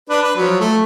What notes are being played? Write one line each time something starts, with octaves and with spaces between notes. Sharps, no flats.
D4 B4
B4
F3 F#3
A3